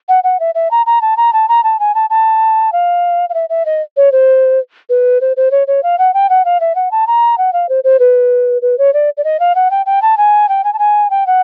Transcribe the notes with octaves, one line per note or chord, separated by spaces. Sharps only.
F#5
F#5
E5
E5
A#5
A#5
A5
A#5
A5
A#5
A5
G#5
A5
A5
F5
F5
E5
E5
D#5
C#5
C5
B4
C5
C5
C#5
C#5
F5
F#5
G5
F#5
F5
E5
F#5
A5
A#5
F#5
F5
C5
C5
B4
B4
C#5
D5
D5
D#5
F5
F#5
G5
G5
A5
G#5
G5
G#5
A5
G#5
G5
F#5